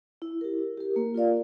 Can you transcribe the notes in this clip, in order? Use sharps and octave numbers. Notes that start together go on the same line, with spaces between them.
E4
G4 A#4
E4
G4 A#4
A#3
F4 A#4 D5 F5